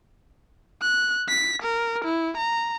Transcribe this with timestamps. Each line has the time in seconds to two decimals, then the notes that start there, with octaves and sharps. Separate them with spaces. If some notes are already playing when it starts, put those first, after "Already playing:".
0.81 F#6
1.29 B6
1.62 A#4
2.05 E4
2.37 A#5